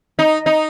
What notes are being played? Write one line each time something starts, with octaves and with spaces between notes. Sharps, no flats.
D#4
D#4